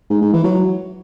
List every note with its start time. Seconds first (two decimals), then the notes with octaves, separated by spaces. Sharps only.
0.10 G#2
0.22 G#2
0.33 E3
0.44 F#3